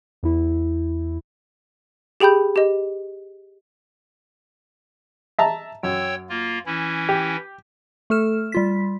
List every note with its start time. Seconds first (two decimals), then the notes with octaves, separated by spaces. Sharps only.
0.23 E2 E4
2.20 G4 G#4 G5 B5 G6
2.56 G4 D#5
5.39 E5 A5 A#5
5.83 F#2 C#5 G5 E6
6.30 A#3 F4
6.66 E3 C#4 E4
7.09 G4
8.10 A3 A4 F6 E7
8.52 G3 F4 B6